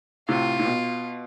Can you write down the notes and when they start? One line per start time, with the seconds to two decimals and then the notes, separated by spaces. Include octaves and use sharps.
0.28 A2 C3 F4
0.59 A2
0.65 B2